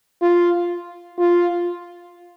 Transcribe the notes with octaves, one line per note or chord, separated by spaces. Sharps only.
F4
F4